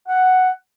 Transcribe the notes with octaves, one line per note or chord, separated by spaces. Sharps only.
F#5